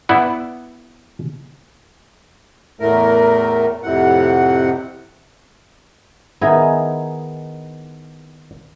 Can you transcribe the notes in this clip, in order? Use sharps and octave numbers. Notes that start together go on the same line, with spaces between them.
B3 E4 D5 F#5
E2 A2 A3 A#4
F2 A2 C3 F#5
D#3 B3 D#4 E4 G#4 G#5